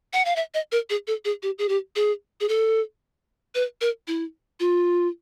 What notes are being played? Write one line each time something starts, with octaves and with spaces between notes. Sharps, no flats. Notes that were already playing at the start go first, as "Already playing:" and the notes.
F#5
F5
E5
D#5
A#4
G#4
A4
G#4
G4
G#4
G4
G#4
G#4
A4
B4
A#4
E4
F4